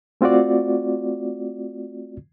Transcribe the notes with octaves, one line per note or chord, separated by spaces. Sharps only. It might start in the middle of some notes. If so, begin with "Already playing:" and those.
A3 C4 F4 F#4 D5